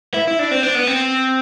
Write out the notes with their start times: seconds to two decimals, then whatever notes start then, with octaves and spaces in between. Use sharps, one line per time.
0.14 E4
0.28 E4
0.39 D4
0.51 C4
0.63 D4
0.75 B3
0.87 C4